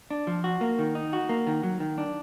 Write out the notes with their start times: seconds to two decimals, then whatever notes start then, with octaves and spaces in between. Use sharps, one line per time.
0.10 D4
0.27 F3
0.44 F#4
0.61 A#3
0.79 D#3
0.95 D#4
1.13 F#4
1.29 A#3
1.47 D#3
1.63 F#3
1.80 D#3
1.98 D4